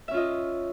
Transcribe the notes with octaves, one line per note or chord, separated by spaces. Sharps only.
C#4 F4 D#5 E5